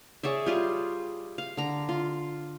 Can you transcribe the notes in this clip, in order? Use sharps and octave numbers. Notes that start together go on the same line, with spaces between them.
G#4 C#5 D5 E5
G3 F4 G#4
F5
D3 A#5
F4